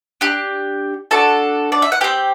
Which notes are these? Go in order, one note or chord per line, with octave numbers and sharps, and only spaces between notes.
D4 G4
D4 F#4 A4 A5
D5
E5
F#5
C4 G4 G5